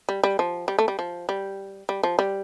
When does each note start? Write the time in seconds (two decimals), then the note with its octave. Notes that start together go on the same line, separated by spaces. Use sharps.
0.09 G3
0.24 G3
0.39 F3
0.68 G3
0.79 A3
0.88 G3
0.99 F3
1.29 G3
1.89 G3
2.03 F3
2.19 G3